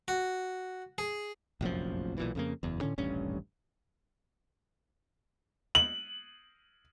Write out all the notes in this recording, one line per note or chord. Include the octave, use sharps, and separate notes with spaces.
F#4
G#4
F1 A#1 F#2 F3
B1 A#2 E3
F2 C#3 A#3
F#1 E2
A2 D3 C#4
D#1 A1 G2 C#4
F#7